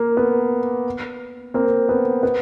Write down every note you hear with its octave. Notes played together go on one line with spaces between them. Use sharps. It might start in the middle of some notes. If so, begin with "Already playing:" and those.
Already playing: A#3
B3
A#3 C4
B3
B3